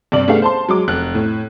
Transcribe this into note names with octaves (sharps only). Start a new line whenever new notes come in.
G2 C3 D5 F#7
A3 B3 D4 G4 G#4 F5
C5 A5 C6
F#3 G#3 D6
F1 F#6
A2